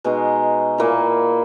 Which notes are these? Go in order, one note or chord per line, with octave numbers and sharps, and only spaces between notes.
B2 G#3 D#4
A#2 A#3 E4